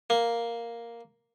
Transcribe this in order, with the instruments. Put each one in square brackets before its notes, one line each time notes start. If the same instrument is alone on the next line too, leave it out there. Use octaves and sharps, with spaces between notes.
[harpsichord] A#3